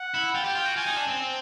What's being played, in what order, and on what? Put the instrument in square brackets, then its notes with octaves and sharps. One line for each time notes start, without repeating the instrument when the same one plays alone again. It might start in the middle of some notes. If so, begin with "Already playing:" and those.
Already playing: [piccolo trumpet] F#5
[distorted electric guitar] E4
[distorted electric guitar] F4 [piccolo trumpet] G5
[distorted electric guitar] G4
F4
F#4
[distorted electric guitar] F4 [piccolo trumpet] G#5
[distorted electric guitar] D#4
D4
C4